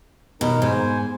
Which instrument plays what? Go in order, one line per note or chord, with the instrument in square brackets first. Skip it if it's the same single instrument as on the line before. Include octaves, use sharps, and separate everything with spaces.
[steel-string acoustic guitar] B2 [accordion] D#4 A#4
[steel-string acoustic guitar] G#2 [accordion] C5 G#5